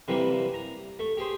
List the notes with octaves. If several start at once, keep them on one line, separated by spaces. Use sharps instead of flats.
C3 E3 G3 A#3
A#5
A3
G4 G#4 C5